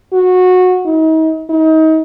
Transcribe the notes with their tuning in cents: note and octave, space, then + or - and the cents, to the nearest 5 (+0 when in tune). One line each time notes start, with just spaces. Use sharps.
F#4 -15
D#4 +40
D#4 +30